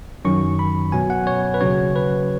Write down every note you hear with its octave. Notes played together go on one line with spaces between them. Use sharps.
F#2 D#3 F#3 C#4 C#6
B5
B2 F#3 B3 G#5
F#5
C#5
B4
D#2 C#3 F#3 C#4 C#5
B4